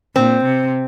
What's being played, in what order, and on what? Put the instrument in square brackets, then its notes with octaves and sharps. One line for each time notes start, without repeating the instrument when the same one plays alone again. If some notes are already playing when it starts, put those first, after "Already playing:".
[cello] A#2 [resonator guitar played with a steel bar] C4
[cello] C3